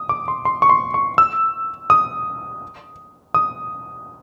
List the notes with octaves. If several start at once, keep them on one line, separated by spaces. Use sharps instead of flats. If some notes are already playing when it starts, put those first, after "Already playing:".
Already playing: D#6
D6
C6
C6
C#6
C6
C#6
E6
D#6
D#6